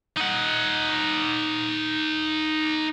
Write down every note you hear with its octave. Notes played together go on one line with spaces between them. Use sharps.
D#4 F#5